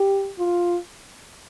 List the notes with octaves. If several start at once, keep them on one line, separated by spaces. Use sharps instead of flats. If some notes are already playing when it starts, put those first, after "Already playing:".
Already playing: G4
F4